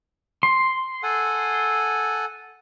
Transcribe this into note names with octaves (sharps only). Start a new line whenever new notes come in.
C6
A4 F#5 G#5